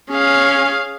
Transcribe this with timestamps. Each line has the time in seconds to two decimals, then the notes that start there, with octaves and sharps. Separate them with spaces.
0.11 C#4 G#4 F5